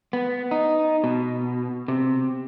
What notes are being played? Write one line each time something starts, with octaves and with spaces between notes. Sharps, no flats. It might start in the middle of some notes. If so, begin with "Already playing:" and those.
B3
D#4
B2
C3